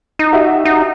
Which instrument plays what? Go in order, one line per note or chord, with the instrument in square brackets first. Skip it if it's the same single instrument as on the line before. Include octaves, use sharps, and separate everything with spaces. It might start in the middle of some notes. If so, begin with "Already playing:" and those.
[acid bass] D#4
[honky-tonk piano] F#4 G4 E5
[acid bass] D#4